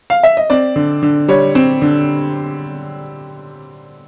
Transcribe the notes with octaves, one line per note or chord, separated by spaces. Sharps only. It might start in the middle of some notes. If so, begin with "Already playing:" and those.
F5
E5
D#5
C4 D5
D3
D3
G3 C#5
C4
D3